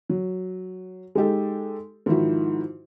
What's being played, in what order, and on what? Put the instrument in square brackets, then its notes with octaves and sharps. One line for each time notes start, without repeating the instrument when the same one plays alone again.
[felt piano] F#3
G#3 D#4 G4 A4
G#2 D#3 F3 E4 F#4